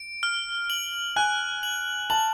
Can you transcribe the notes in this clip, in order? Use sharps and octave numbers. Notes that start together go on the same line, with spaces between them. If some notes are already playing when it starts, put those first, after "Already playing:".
Already playing: D7
F6
F#7
G#5 F#6
F#7
A5 F#7